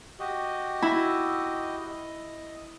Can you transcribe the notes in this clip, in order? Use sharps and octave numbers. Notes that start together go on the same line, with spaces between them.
F#4 G4 D#5
E4
D#5